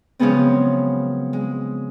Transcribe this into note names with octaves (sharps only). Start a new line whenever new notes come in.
C#3 F3 F#3 G#3 B3 C4
G#3